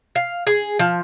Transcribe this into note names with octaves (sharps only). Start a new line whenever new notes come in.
F5
G#4
F3